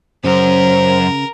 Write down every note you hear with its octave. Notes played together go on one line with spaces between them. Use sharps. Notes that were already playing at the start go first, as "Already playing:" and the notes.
F#2 C#3 A#4 C5